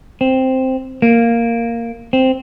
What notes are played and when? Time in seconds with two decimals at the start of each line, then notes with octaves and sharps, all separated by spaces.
0.21 C4
1.02 A#3
2.13 C4